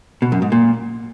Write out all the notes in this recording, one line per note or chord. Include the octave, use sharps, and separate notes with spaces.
B2
F#2
G#2
A#2